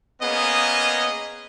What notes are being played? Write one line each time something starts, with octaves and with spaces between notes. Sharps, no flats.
A#3 B3 C#4 G#4 D#5